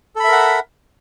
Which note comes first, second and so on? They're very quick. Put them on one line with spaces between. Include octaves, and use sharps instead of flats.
A4 B5 E5 A#4 F#5